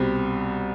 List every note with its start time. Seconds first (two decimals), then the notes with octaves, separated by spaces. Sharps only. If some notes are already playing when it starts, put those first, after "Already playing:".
Already playing: C2 B2 G3 C4